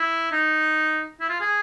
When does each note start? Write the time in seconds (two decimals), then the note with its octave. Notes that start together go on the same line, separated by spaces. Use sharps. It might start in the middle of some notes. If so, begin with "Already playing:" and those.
Already playing: E4
0.32 D#4
1.20 E4
1.30 F4
1.40 G#4